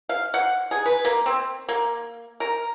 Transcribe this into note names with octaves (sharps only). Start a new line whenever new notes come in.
F5
F#5
G#4
B4
A#3
C4
A#3
A#4